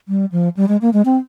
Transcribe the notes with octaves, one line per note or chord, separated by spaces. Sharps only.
G3
F3
G3
G#3
A#3
G#3
C4